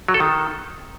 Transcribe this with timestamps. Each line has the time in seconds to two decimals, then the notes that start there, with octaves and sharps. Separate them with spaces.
0.08 F#3
0.14 A4
0.20 D#3